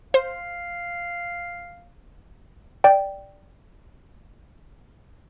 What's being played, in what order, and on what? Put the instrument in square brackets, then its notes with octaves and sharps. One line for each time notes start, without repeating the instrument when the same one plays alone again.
[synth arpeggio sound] C5 [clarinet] F5
[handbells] D5 G5